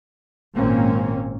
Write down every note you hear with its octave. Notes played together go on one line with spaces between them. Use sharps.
G#1 A#2 A#3 C4 C#4